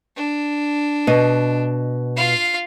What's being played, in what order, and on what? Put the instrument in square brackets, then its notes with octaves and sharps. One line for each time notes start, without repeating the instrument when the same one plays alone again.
[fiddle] D4
[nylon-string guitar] B2 D#5
[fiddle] F4 F5